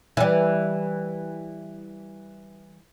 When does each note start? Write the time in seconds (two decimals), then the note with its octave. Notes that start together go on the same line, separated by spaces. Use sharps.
0.17 E3 G3